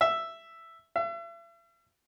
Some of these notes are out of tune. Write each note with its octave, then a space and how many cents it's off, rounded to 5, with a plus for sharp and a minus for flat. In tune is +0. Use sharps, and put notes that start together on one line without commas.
E5 +5
E5 +40